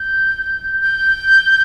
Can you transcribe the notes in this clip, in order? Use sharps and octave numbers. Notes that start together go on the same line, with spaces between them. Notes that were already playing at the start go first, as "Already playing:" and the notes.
Already playing: G6
G6